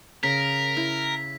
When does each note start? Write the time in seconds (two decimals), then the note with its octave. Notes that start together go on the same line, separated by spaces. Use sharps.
0.23 C#3 A#4 B6
0.77 E4